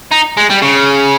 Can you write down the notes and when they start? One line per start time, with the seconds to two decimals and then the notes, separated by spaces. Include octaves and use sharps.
0.11 D#4
0.37 G#3
0.50 G3
0.62 C#3